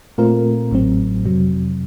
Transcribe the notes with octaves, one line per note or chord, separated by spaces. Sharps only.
A#2 A3 C4 F4 A#4
A1 A2 F#3 C4
F2 C3 F#3